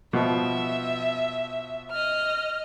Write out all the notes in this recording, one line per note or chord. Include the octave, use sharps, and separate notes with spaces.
B2 F3 E5
D#5 F6